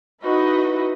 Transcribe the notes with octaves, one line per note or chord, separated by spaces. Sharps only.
D#4 E4 F#4 B4 D#5